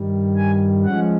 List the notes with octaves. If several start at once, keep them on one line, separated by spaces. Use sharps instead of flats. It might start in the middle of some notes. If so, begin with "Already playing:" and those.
Already playing: G2 D#3 G3
G#5
F3 G#3 C#4 F#5